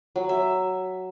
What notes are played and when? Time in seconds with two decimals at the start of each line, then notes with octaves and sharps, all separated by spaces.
0.16 F#3
0.29 E5